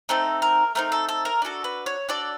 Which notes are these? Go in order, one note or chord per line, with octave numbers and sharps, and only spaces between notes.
A3 C4 D#4 A4
A#4
A3 C4 D#4 A#4
A4
A4
A#4
D4 F#4 A4
B4
C#5
D4 F#4 A4 D5